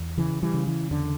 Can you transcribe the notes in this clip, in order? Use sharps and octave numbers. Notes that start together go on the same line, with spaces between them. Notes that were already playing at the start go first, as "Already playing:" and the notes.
Already playing: E2
C#3 E3
E3 G3
C#3
E3
E2 D3